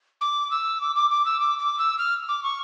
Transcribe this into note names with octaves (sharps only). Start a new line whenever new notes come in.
D6
E6
D6
D6
D6
E6
D6
D6
E6
F6
D6
C#6